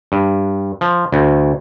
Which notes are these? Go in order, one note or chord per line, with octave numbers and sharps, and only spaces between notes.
G2
F3
D2